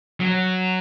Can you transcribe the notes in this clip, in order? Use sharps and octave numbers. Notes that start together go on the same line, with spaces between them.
F#3